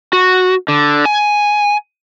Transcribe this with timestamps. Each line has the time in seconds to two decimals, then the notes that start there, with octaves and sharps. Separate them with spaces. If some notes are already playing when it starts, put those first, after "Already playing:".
0.13 F#4
0.68 D3
1.06 G#5